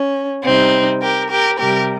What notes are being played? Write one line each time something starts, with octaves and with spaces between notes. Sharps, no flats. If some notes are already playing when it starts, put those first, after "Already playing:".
Already playing: C#4
C3 G3 C4 D#4
G4 A#4
G4 A#4
C3 G3 G4 A#4